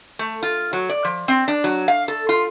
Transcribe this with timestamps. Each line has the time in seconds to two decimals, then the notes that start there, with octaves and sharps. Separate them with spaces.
0.19 A3
0.43 F4
0.73 F#3
0.90 D5
1.05 F3
1.28 C4
1.48 D4
1.64 F#3
1.88 F5
2.08 A4
2.29 F4